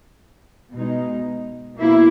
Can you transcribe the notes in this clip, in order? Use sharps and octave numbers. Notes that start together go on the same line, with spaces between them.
B2 G#3 D#4
B2 A#3 E4